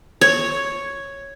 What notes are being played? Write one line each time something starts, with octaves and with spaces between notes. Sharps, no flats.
C#5